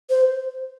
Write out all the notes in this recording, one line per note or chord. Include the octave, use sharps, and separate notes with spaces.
C5